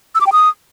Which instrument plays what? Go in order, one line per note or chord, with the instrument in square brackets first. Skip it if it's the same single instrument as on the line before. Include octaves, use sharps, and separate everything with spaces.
[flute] E6
D6
G5
D#6